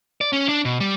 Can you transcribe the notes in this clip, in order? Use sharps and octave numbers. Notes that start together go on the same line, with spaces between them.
D5
C#4
D4
B2
G3